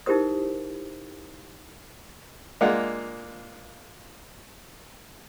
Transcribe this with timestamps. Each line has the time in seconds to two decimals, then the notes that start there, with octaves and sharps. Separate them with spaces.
0.06 D#4 E4 G4 A#4 C5 D#6
2.61 G#3 A#3 D4 F4 F#5